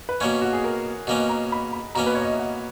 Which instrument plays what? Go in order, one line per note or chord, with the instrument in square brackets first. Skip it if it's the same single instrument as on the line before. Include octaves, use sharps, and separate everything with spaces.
[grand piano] B4
[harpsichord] B2 A#3 C#4 [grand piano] C#5
[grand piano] F#4
G#4
A#4
[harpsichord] B2 A#3 C#4 [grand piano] D#5
[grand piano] A#5
B5
B5
[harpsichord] B2 A#3 C#4 [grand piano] A#5
[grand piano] B4
C#5
D#5
E5
F#5